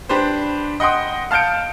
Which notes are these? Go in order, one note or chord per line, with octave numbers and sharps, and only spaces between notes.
D4 G4 B4 C5
D#5 F#5 G5 C6 D#6
F5 A5 F6 G6 C#7 D7